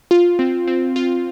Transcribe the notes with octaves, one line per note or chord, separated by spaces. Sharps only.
F4
C4
C4
F4